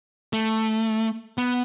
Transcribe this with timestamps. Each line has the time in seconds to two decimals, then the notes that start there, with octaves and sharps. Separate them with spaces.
0.33 A3
1.38 B3